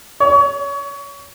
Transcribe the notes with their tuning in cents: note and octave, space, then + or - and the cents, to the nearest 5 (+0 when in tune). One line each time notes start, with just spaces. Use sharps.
C#5 +25